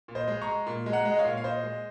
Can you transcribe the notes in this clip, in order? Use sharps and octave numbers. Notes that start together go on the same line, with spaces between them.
A#2
C5 D#5
G#3
A#5 C#6
G#3
A#2
G#3
F#5 A#5
G#3
D#5
C#5 F5
A#2
F5
A#2 C5 D#5
G#3